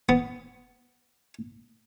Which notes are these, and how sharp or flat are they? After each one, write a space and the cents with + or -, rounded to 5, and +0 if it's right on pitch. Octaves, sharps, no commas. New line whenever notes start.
B3 +10